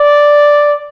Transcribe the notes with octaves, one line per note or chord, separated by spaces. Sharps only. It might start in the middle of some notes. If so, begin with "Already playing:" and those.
Already playing: D5